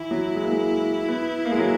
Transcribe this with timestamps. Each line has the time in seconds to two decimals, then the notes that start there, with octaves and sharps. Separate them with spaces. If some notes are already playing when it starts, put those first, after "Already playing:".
Already playing: E3 E4
0.11 F#3
0.35 G#3
0.44 A#3
0.52 G#3
1.08 B3
1.45 A#3
1.51 G#3
1.59 F#3